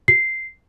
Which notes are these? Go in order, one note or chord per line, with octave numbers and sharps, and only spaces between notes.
C7